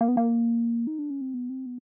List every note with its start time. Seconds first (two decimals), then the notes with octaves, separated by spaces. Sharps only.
0.01 A#3
0.08 B3
0.17 A#3
0.87 D#4
0.99 D4
1.10 C#4
1.21 C4
1.34 B3
1.49 C4
1.66 B3